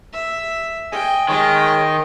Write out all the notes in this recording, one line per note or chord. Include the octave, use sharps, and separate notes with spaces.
E5
D#5 G5 G#5
D#3 G#3 G#4 C#5 D#5 G5